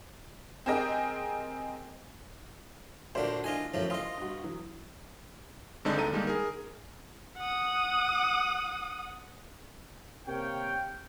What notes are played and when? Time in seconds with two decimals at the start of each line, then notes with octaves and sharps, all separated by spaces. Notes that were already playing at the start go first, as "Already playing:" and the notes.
0.66 C4 G4 G#4 A#4 D#5 G5
3.15 A#2 D4 F#4 A4 C5
3.44 D4 E4 F4 D#5 G#5
3.74 F#2 A2 F3 E4
3.90 F4 D#5 F5 C6 D#6
4.17 G2 F#4
4.44 E3 F#3
5.85 G2 D3 G#3 C4 D4 D#4
5.97 D2 A4 A#5 D#7
6.11 D3 D#3 G3 G#3 A#3 D#4
6.27 G#4 A#4
7.38 F#5 D#6
10.27 C3 A#3 A#4 C#5 F5 G5